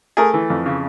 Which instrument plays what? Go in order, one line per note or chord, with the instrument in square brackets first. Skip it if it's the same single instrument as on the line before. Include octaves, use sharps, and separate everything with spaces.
[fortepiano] A3 G#4 A#4
E3
F2
C#3